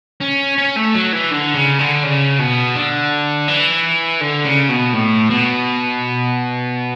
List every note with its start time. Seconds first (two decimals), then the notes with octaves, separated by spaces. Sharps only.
0.21 C#4
0.58 C#4
0.76 A3
0.95 F#3
1.13 E3
1.31 D3
1.54 C#3
1.79 D3
2.03 C#3
2.39 B2
2.75 D3
3.48 E3
4.21 D3
4.45 C#3
4.69 B2
4.93 A2
5.30 B2